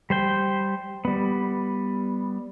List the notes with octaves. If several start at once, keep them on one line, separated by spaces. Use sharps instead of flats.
G3 C5 G5
G3 B3